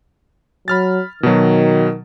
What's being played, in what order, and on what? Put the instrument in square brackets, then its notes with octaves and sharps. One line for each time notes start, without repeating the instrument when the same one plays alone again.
[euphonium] F#3 [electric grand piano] B5 F6 A6
[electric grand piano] B2 F#3 [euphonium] D#3